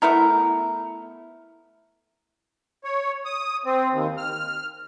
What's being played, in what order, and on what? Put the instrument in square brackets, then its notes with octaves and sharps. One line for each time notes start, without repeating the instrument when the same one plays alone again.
[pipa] A3 B3 E4 A#4
[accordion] C#5
D#6
C4
D#2
F6